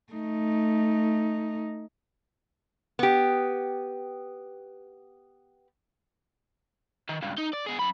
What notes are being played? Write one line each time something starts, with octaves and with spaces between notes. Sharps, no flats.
A3 D#4
B3 G4
D#3
C#2 G2
D#4
D5
B2 G#4
F#2 B5